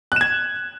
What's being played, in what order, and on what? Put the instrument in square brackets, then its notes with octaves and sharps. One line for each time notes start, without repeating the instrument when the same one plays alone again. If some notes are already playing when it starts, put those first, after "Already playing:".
[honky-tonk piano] F#6
E7
G#6